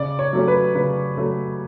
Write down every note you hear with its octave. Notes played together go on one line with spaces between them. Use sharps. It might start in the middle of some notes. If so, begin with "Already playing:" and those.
Already playing: C#3 D5
C#5
F#3 A3 C#4
B4
C#3 B4
F#3 A3 C#4